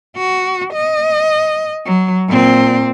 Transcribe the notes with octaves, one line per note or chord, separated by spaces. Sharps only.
F#4
D#5
F#3
A#2 C4